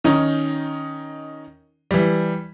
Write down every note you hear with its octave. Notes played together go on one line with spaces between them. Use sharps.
D#3 C#4 D#4
E3 G3